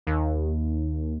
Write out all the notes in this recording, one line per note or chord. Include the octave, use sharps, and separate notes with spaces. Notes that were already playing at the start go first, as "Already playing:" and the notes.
D#2